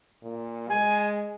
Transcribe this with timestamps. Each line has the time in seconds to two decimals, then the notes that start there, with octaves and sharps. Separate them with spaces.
0.22 A#2
0.70 G#3 G#5